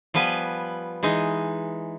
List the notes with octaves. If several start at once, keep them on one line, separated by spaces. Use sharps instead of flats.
F3 G3 B3 B4 G#5
E3 G#3 D#4